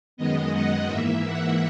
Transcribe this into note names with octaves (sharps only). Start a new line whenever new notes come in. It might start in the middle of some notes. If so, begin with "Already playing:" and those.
F#2 D#3 G#3 B3 D#5
F#5
G#2 E3 A#3 E5
F#5